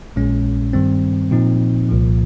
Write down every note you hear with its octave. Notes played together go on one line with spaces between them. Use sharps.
A#1 A#2 G#3 C#4
G2 D#3 G3 C4
A#2 F3 C4 D#4
C2 A#2 F3